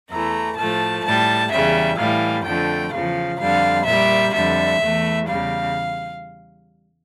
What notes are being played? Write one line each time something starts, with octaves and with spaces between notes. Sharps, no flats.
E2 E3 A3 A#5
A2 F3 A3 A5
A2 G3 A5
E2 C#3 G3 E5
A2 E3 G3 F5
F2 D3 F3 A3 G5
E2 C#3 F3 F5
F2 D3 G3 F5
A#2 G3 E5
F2 D3 G3 E5
E2 E3 A3
E2 C#3 G3 F5